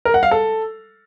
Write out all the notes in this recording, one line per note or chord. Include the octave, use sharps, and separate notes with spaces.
A#4
F#5
F5
A4